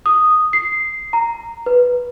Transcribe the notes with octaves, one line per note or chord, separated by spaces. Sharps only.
D#6
C7
A#5
B4